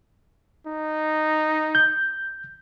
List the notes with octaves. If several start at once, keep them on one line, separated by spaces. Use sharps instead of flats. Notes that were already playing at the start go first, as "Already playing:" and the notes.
D#4
G6